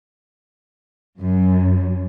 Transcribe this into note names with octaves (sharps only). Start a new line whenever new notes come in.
F#2